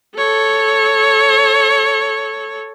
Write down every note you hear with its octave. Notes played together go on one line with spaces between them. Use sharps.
A4 C#5